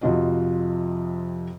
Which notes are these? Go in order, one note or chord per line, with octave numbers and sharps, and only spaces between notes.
F2 C3 F3 F4 F#4 D#5